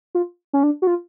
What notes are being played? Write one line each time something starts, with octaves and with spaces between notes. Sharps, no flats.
F4
C#4
D4
F#4
F4